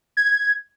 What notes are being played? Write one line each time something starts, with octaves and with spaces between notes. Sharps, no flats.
G#6